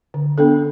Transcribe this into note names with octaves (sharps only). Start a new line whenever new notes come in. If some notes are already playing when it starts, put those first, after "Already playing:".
D3
B3 D4 A4